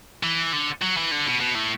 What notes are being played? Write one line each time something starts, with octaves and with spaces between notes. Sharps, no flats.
E3
D3
F#3
E3
D3
B2
B2
A2